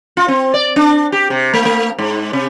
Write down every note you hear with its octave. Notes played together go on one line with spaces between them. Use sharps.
F4
C4
D5
D4
G4
C3
A3
A3
G#2
C3